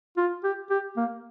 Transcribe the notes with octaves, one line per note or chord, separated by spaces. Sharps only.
F4
G4
G4
A#3